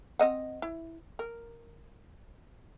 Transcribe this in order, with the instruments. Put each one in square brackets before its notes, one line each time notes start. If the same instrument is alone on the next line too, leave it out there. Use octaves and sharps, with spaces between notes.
[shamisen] C4 D#5 F#5
E4
A#4